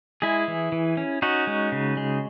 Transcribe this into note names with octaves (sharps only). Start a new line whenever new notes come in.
G#3 E4 G#4
E3
E3
C#4
C#4 D#4 F#4
G#3
C#3
G#3